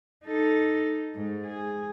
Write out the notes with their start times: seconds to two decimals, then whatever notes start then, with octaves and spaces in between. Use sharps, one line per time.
0.25 D#4 A4
1.15 G#2
1.46 G#4